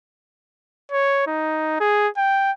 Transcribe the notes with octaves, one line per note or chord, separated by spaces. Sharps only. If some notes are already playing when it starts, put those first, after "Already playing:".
C#5
D#4
G#4
G5